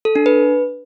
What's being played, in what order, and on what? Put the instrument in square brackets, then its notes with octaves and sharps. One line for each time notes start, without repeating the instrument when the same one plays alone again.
[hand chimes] A4
D4
B4